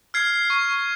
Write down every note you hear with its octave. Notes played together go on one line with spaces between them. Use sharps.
F6 G#6 C7
C#6